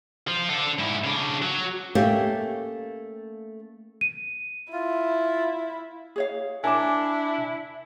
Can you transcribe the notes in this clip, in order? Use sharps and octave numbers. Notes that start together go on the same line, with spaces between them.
F3 F4
D4 A4
G#2 E4
C#3 D4
F#3
A3 A#3 C#4 G4
D#7
E4 F4
G#4 C#5 F5
D4 E4 A#4 G#5 A5 D6